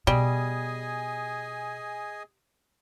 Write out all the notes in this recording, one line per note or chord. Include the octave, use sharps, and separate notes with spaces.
B2 G3 G#4 D#5 G#5